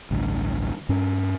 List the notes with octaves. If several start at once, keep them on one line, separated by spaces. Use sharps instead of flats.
A1 D2 G2
G2 C#4